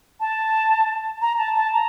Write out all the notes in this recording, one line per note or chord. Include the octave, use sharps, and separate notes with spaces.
A5
A#5
A5
A5
A#5